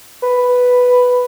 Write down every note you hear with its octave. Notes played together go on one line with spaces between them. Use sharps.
B4